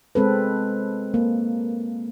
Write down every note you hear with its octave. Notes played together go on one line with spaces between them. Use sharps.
G#3 C4 A4 B4
A#3